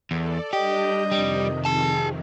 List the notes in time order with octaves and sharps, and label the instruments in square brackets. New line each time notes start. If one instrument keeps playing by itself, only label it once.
[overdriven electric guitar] E2 [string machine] A4 D5
[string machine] G3 D4 G6 [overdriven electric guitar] G4 [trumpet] D#5
[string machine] F2 C3 D#3 [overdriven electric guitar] G3
[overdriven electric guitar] G#4 A5